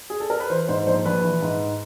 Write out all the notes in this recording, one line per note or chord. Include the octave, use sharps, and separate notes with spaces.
G#4
A4
A#4
B4
E3 C5
G#2 C5
A#1 C5
A#1 B4
E3
G#2